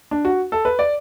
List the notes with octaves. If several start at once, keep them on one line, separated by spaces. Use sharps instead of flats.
D4
F#4
A4
B4
D5